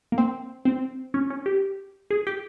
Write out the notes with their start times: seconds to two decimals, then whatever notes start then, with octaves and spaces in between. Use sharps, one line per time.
0.12 A#3
0.18 C4
0.65 C4
1.14 C#4
1.30 C#4
1.46 G4
2.10 G#4
2.27 G4